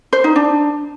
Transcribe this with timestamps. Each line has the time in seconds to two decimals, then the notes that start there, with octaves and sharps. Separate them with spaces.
0.13 C5
0.24 D#4
0.36 D4